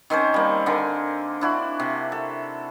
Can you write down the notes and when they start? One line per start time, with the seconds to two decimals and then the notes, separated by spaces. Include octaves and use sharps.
0.10 D#3 C4 C#4 C5
0.34 G3 A#3
0.66 D3 A#3 G#5
1.41 D4 E4 F#4
1.80 C3
2.12 A4